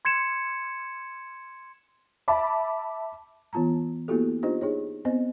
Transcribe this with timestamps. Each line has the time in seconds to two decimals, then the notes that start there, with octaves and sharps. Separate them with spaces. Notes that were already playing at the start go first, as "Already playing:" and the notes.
0.05 C6 G#6 C#7 E7
2.28 E5 A5 B5 D6
3.53 E3 B3 F4 A5 A#5
4.08 A#3 B3 E4 F#4 G4 A4
4.43 D4 D#4 F4 G4 C5 D#5
4.61 D#4 G#4 C#5
5.05 B3 C4 C5 D#5